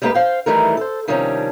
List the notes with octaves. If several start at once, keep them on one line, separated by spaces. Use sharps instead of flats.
G3 G#3 A#3 E4 G4 B4
C5 F5 G5
D#3 E3 G3 A3 A#4
A4 C5
C3 D#3 F3 G3 C#4 D4